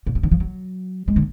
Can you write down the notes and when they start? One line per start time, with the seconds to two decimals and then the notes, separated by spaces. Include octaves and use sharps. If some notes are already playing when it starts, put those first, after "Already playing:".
0.07 A#2
0.15 B2
0.23 D3
0.32 F3
0.40 F#3
1.08 G#3
1.16 D3